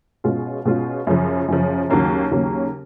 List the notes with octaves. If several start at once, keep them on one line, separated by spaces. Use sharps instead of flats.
B2 G#3 C#4 F4
B2 G#3 C#4 F4
F#2 C#3 F3
F#2 C#3 F3
D#2 C#3 F#3 A#3 C#4
D#2 C#3 F#3 A#3 C#4